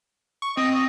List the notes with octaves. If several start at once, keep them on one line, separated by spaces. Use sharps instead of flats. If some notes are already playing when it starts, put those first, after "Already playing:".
C#6
C4 D#5
D#5